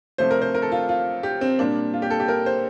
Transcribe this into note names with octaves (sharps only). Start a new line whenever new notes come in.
C3 F3 A3 C5
A#4
C5
A#4
A4
F4
F4
G4
C4
A#2 G3 A#3 D4
F4
G4
A4
G4
A#4
C5